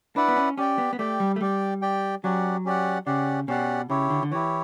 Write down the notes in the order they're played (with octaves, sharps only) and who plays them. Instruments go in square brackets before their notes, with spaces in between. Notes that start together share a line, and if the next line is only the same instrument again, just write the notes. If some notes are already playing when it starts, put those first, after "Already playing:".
[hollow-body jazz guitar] D4 [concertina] E4 B4 D5 F#5
[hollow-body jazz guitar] B3
C#4
[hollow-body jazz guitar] C#4 [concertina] G4 D5 G5
[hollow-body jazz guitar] B3
B3
[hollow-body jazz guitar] A3 [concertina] G4 D5 G5
[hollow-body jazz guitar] G3
A3
[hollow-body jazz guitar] G3 [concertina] G4 D5 G5
[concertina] G4 D5 G5
[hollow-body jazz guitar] F#3 [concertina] C#4 G4 D5 F#5
[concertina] C#4 G4 D5 F#5
[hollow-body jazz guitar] C#3 [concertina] C#4 G4 D5 F#5
[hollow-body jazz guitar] B2 [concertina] C#4 G4 D5 F#5
[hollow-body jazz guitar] C#3 [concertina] E4 G4 C#5
[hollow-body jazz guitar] D3
D3
[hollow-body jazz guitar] E3 [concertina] E4 G4 C#5